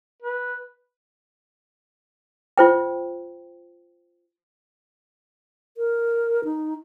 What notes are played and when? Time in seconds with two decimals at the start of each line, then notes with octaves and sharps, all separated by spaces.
0.22 B4
2.58 F4 C5 G5
5.77 A#4
6.44 D#4